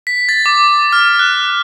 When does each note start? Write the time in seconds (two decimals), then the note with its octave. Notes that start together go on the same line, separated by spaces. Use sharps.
0.07 B6
0.29 A6
0.46 D6
0.93 F6
1.19 F#6